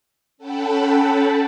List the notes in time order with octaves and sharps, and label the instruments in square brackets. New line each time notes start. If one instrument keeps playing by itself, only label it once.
[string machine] C#4 A4 F#5 G5 A5 B5